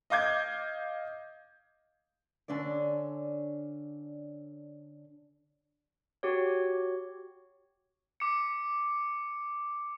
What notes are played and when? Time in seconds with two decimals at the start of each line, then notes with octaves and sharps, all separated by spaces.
0.10 D#5 F5 D6 G6 G#6
2.48 D3 C#4 D4 A4 D5
6.23 F#4 G4 C#5
8.20 D6 C#7